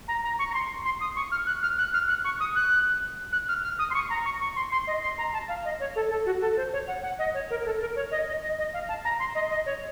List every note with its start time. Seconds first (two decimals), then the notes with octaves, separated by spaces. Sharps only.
0.08 A#5
0.23 A#5
0.39 C#6
0.50 A#5
0.54 C6
0.85 C6
1.00 D#6
1.16 C#6
1.32 F6
1.46 F#6
1.63 F6
1.78 F#6
1.94 F6
2.09 F#6
2.24 C#6
2.40 D#6
2.55 F#6
3.33 F#6
3.49 F6
3.63 F6
3.79 D#6
3.90 C6
3.95 C#6
4.10 A#5
4.25 C#6
4.40 C#6
4.56 C6
4.72 C6
4.87 D#5
5.02 C6
5.18 A#5
5.33 A5
5.49 F5
5.65 D#5
5.80 C#5
5.96 A4
6.10 A4
6.26 F#4
6.41 A4
6.57 C5
6.73 C#5
6.88 F#5
7.03 F#5
7.19 D#5
7.34 C#5
7.50 A#4
7.65 A4
7.81 A#4
7.96 C#5
8.11 D#5
8.27 D#5
8.42 D#5
8.58 D#5
8.73 F5
8.89 A5
9.05 A#5
9.19 C6
9.35 D#5
9.50 D#5
9.66 C#5